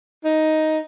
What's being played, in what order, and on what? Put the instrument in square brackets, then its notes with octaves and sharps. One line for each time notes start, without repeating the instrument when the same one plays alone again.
[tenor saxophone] D#4